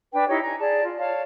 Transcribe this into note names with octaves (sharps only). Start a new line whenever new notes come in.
D4 B4 G5
D#4 E4 G4 C#5
G#5 A#5
G#4 D5 A5
F4
C#5 D5 F5 A5